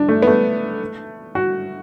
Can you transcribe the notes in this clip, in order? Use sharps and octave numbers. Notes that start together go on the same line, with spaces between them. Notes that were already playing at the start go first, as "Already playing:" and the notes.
Already playing: D4
A3
B3
A3
F#4